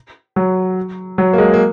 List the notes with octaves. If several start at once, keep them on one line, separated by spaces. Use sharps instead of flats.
F#3
F#3
A#3
G#3
A#3